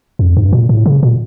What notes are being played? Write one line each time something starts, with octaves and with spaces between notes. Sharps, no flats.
F2
G2
A#2
A2
C#3
A#2